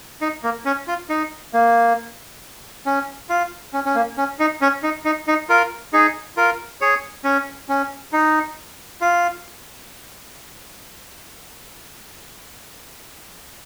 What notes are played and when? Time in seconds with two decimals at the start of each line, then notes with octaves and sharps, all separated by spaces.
0.21 D#4
0.43 A#3
0.65 C#4
0.88 F4
1.09 D#4
1.54 A#3
2.86 C#4
3.30 F4
3.73 C#4
3.85 C#4
3.95 A#3
4.18 C#4
4.39 D#4
4.61 C#4
4.83 D#4
5.05 D#4
5.28 D#4
5.49 F4 A#4
5.93 D#4 G#4
6.37 F4 A#4
6.81 G#4 C#5
7.24 C#4
7.69 C#4
8.13 D#4
9.01 F4